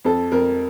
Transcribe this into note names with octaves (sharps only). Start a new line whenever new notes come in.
F2 A4
F2 A#4